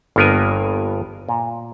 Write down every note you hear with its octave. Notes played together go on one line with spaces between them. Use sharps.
G1 G2 A#3 B3 A#4 G#5
A#2